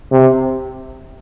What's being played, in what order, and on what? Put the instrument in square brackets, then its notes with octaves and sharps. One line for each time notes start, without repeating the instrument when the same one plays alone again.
[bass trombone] C3